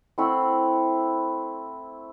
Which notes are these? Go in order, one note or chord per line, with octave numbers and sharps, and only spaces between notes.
A3 C4 E4 F#5